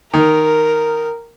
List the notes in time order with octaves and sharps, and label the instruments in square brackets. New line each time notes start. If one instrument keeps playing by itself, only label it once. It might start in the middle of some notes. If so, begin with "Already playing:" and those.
[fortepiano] D#3 [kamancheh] A#4